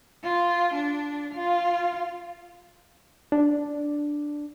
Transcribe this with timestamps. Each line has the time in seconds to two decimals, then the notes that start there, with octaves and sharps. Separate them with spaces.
0.23 F4
0.75 D4
1.35 F4 F5
3.32 D4